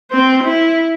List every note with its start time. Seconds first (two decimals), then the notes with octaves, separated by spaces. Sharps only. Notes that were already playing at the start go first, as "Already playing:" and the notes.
0.11 C4 C5
0.43 E4